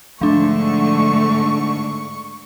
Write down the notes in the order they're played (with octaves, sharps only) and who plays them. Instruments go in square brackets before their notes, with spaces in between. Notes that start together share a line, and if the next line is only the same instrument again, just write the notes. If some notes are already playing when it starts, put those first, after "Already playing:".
[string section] G#2 D3 [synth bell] F3 D4 [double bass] A3 [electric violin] C#6